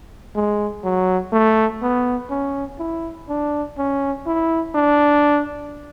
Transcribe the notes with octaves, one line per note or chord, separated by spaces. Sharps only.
G#3
F#3
A3
B3
C#4
E4
D4
C#4
E4
D4